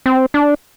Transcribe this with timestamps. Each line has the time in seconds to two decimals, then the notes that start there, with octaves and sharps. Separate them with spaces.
0.06 C4
0.34 D4